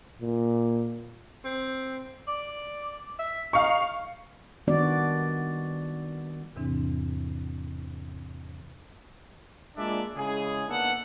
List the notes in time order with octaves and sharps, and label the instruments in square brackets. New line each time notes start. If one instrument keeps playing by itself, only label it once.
[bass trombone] A#2
[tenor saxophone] C4
D5
E5
[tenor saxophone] D#4 [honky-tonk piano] F5 C#6
[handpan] D#3 G3 B3 D4 F#4 D5
[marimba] E2 G#2 C3 E3 C4 D4
[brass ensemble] G#3 A#3 D4 F4 D5 E5
C#3 G#3 E4 G#4
A#3 B3 D4 D#4 A4 F#5